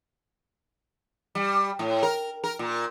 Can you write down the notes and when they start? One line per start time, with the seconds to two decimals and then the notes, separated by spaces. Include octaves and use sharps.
1.35 G3
1.79 A2
2.03 A#4
2.44 A#4
2.59 A#2